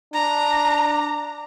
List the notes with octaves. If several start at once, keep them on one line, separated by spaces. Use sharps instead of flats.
D4 A#5